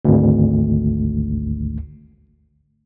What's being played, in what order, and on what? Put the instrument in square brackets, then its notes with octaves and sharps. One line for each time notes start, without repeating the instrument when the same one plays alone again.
[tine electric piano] G#1 D2